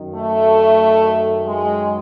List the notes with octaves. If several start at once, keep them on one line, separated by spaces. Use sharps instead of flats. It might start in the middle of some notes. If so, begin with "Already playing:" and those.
Already playing: F#2 D#3
A3
G#3